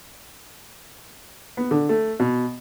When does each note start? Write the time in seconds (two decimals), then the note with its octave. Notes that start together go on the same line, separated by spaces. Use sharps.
1.57 B3
1.71 D3
1.89 A3
2.20 B2